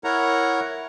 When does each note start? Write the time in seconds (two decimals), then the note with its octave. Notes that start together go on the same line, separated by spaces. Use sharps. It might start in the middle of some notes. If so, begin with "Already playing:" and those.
0.04 E4 A#4 C#5 F#5 A#5